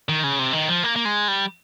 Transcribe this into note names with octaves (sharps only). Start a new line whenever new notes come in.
D#3
C#3
C3
D#3
F3
A#3
A#3
G#3
G3